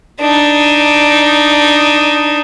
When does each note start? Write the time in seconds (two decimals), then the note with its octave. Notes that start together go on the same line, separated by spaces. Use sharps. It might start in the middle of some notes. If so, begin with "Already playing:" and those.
0.20 D4 D#4